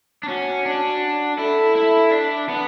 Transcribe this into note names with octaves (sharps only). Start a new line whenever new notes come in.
D4
C#4 F#4
D4
E4 A4
E4
D4
B3